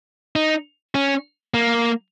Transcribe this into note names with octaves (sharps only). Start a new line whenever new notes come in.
D#4
C#4
A#3